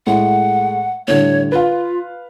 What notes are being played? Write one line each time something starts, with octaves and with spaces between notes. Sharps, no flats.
A2 G#3 F#5
A2 D3 G3 C#5
F4 B4 F5